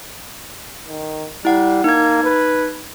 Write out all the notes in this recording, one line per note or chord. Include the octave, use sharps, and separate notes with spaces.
D#3
G3 E4 F#5
A#3 D#4 G#6
B4